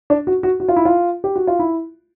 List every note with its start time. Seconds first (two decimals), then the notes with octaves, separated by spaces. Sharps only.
0.10 D4
0.27 F#4
0.43 F#4
0.60 F#4
0.68 F4
0.76 E4
0.85 F4
1.24 G4
1.36 F#4
1.47 F4
1.59 E4